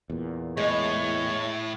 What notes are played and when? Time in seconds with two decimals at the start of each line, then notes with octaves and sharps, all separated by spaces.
0.10 E2 A#2
0.57 A2 G#3 C#5